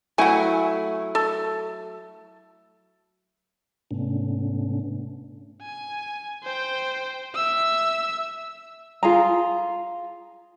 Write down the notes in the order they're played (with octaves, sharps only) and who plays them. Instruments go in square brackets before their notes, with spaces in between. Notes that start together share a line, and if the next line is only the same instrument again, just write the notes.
[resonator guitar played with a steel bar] F#3 A3 E4 [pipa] F#5 G#5
[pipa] A4
[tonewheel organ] G#2 C3 A3 B3 C#4 D4
[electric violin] G#5
C5 G5
E5 E6
[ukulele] F4 G#4 A#5